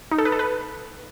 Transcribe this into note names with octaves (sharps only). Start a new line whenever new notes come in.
D#4
A4
B4
A4
B4